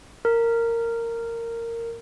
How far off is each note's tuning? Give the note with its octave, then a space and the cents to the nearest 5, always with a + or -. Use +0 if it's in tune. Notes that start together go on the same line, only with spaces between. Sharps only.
A#4 -15